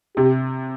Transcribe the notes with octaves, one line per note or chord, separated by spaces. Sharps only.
C3 G4